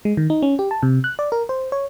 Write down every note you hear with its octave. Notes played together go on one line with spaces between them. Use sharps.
G#3
D#3
D#4
C#4
G4
A5
C3
F#6
D5
A#4
C5
C#5